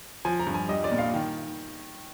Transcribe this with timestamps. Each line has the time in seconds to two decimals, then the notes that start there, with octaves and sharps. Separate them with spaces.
0.25 F3 G#5
0.40 A#5
0.47 G2
0.54 G#5
0.69 G3 D#5
0.84 D5
0.91 A#2
0.98 F5
1.14 D#3